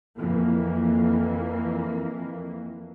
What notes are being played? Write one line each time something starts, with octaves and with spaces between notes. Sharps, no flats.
F2 E3 A#3